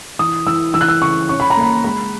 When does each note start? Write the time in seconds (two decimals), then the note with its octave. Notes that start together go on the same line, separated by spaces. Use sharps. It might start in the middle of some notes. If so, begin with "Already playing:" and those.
0.19 E3 D#6
0.46 E3 E6
0.74 E3 E6
0.81 F#6
0.88 E6
1.02 C#3 C#6
1.29 C#4 C#6
1.40 B5
1.50 A#5
1.57 A#3 B5
1.84 G#3 B5